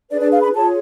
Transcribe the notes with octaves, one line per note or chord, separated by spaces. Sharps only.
D4 G#4 B4 D5
D5
F5
B5
F4 G#4 C#5 A5